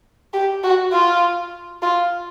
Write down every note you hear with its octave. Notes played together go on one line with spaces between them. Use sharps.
G4
F#4
F4
F4